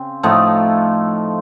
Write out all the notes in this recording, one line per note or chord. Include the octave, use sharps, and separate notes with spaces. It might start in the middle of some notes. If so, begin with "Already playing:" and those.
Already playing: C#3 C4
A2 F3 A3 D#4